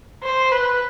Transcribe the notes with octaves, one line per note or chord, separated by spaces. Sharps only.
C5
B4